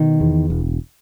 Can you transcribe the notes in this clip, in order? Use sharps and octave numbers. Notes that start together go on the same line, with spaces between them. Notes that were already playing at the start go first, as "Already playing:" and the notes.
Already playing: B2 D#3
E2
E1